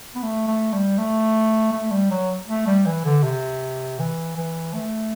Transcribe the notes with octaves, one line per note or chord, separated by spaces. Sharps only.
B3
A3
A3
G3
A3
A3
G3
F#3
A3
G3
E3
D3
C3
E3
E3
A3